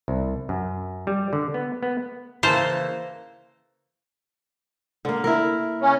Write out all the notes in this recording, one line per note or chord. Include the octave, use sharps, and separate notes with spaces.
C2
F#2
G3
D3
B3
B3
C#3 E3 A#3 C5 F5 A5
D3 A#3
E4 A#4
C#3 C#4